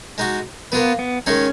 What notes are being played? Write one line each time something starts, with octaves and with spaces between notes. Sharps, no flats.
G#3 D#4 F#4
A#3 B3 F4 B4
B3
D#3 G#3 C#4 D#4 G#4